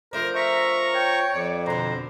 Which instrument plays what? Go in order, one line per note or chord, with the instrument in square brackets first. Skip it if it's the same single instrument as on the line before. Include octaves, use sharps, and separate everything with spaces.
[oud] F3 A3 D4 [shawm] A#4 [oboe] C5
[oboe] A#4 [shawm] E5 [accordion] A#5 C#6
[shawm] C#5 [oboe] G5
[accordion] F2 [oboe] D5
[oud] B2 D3 [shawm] C5 [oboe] A#5